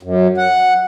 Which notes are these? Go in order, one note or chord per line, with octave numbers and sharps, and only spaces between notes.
F#2
F#5